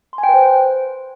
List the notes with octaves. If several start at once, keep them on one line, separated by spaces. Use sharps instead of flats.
C6
G#5
G5
B4
C5